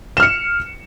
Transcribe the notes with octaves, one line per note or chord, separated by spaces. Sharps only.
F6 C#7 E7